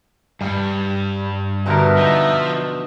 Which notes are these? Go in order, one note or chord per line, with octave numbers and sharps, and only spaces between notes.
G2 G3
B2 D3 G3 A#4 E5
F3 D#4